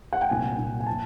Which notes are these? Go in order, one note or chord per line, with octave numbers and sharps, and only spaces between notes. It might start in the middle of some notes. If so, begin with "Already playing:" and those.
F#5
G5
C2 A#2 F#3 G#5
C2 A#2 F#3
G#5
F3 A5